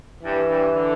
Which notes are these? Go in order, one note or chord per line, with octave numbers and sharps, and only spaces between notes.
G2 E3
G2
D3